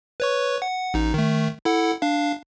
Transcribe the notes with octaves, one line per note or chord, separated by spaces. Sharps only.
B4 C#5 C#6
F#5
A1 D#4
D#3 A3
E4 A4 F#5
D4 F5